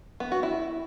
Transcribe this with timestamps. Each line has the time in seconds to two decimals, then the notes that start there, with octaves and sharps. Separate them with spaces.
0.20 B3
0.32 F#4
0.43 E4